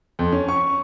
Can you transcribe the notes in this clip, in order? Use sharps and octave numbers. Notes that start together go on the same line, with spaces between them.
F2
C#4
C#6